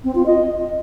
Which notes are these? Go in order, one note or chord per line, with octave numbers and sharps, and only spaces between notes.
C4
F4
D#5